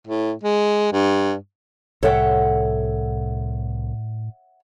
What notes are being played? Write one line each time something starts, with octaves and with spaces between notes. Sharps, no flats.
A2
G#3
G2
C2 A2 A4 C#5 E5 F#5 G5